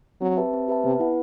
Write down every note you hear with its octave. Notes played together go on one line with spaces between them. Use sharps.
F#3 C4
G4 B4 E5 A5
C4
G4 B4 E5 A5
C3 B3
E4 B4 F#5